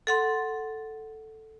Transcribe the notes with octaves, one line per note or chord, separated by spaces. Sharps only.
A4 F#5 C6